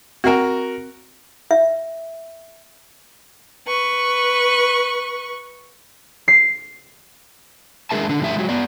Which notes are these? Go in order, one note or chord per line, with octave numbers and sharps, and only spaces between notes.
C4 F#4 A#4 E5 G#5
E5
B4 C#6
C7
G#3 D4 G#4 A#4 E5 A5
D3 D4
A2 F3 G4 E5
F#3 G#3
B3 D5